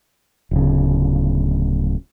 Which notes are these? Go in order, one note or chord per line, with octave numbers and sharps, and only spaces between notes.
D1 C#3